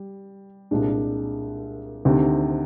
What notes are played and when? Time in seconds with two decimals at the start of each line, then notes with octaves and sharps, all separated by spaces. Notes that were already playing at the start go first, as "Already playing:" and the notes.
Already playing: G3
0.71 C2 A#2 G#3 D4
2.05 D2 C3 D#3